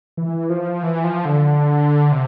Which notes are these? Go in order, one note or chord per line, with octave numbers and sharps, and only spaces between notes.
E3
F3
E3
F3
D3
C3